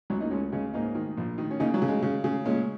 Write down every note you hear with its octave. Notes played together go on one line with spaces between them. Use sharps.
C#2 F#3
A#3 D#4
C#2 G#3 C#4
C#3 G#3 C#4
G#2 A#3 D#4
D#3
A#1
D#3
C#4
C#3 A#3 D#4
F#3
C#3
G#3
C#3
C#3
A#2 G#3 C#4